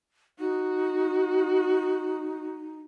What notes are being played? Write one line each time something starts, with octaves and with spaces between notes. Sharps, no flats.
D#4 F#4